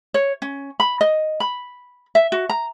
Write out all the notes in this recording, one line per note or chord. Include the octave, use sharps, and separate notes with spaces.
C#5
C#4
B5
D#5
B5
E5
F#4
A#5